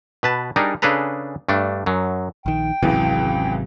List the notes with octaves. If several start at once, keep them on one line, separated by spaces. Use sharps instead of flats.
B2 B4 A5
G3 D4 D#4 G#4 A#4
C#3 D4 G#4 A4 B4 A#5
G2 A3 D4
F#2 F#3
A#1 D#3 G5
G#1 C#2 C3 E3 F#3